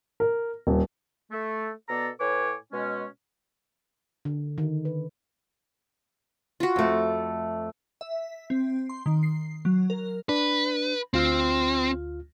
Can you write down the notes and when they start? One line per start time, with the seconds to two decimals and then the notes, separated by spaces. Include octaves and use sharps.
0.20 A#4
0.67 D#1
1.31 A3
1.89 B2 B3 A4 D5 A#5
2.20 A2 B4 C#5 G#5 D6
2.72 B2 G#3 C#4
4.25 D3
4.58 D#3
4.85 B4
6.60 F4 F#4
6.76 F2 A3
8.01 E5
8.50 C4
8.89 C6
9.06 D#3
9.23 C7
9.65 F#3
9.90 A#4
10.29 D4 B4
11.14 D2 C4 F4 F6